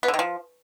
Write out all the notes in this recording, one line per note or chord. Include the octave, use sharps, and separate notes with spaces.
B3
D3
D#3
F3